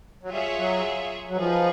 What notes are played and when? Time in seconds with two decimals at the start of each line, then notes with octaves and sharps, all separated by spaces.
0.23 F#3
0.30 G3 F4 G#4 C#5 E5
0.57 F#3
1.28 F#3
1.36 F3 D#4 G#4 B4